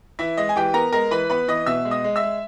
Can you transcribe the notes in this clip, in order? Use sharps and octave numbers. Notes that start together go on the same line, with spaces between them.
E3 E4 E5
G#3 D#5
G#5
E3 G4 G5
B3 A#4 A#5
G#3 A#4 A#5
E3 B4 B5
B3 B4 B5
E3 D#5 D#6
B2 E5 E6
G#3
D#5 D#6
G#3
E5 E6
G#3